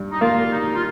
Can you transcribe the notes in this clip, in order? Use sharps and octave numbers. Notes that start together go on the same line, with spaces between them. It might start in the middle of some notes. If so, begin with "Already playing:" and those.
Already playing: G2
D#4
A#3 F4
D#4
F4